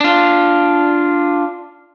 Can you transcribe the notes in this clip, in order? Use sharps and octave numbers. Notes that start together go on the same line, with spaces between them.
D4 F4